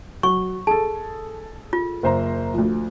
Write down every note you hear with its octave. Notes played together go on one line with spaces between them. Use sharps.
F#3 C#6
G#4 A4 A5
F4
F#1 C5 A#5
D2 F3